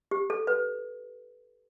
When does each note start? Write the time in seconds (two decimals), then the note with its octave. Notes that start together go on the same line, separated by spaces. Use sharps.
0.11 G4
0.30 A4
0.47 B4